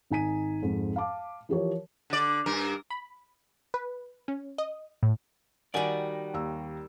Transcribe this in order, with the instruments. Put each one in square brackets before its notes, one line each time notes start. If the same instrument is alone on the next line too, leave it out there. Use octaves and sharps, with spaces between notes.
[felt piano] G#1 D#4 G#5 B6 D#7
F2 G#2
F5 A5 D6
E3 F3 G4 A#4 C#5
[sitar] D3 D5
G2 A#4
[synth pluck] B5
B4
C#4
D#5
A2
[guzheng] D#3 G3 [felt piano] F#4 F#5 [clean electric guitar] D5 G#5
[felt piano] D#2 A#5 E6